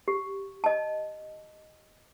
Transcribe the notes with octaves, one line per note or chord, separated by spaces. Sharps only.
G4
D#5 A5